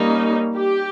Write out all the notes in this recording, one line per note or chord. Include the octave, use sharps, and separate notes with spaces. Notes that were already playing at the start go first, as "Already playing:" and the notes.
Already playing: G3 A#3 C#4 D#4
G4